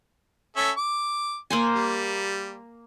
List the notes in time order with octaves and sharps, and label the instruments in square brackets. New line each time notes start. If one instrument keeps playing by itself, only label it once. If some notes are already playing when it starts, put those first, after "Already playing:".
[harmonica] C#4 A4 E5
D6
[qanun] A#3 C5 G#5
[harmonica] G3